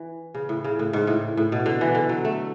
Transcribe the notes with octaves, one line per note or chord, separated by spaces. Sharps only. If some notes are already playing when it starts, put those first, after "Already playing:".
Already playing: E3
C#3
A2
C#3
A2
G#2
A2
A2
B2
D3
E3
D3
F#3
A3